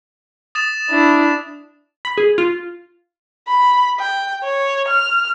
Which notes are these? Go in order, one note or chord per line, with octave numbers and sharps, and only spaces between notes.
D#6 A6 E7
D4 E4
B5
G#4
F4
B5
G5
C#5
F6